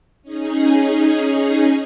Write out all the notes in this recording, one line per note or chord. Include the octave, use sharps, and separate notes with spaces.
C#4 D#4 G#4